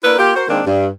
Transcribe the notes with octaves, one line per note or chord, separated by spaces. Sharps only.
A#3 D4 E4 A#4 B4
A#3 F4 G4
F#4 A#4 C5
D#3 G#3 A#3 C4 D4
G2